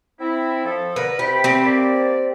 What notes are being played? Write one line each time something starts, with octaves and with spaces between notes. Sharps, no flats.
C4 E4
F3 A4
D3 A#4 B4
C3 G4 G5 B5
C4 G4
A#3 D5